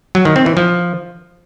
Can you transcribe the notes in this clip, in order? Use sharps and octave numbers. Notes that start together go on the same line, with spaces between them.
F#3
D#3
C4
E3
F3